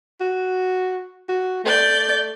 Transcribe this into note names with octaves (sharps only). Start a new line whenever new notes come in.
F#4
F#4
A3 D5 G6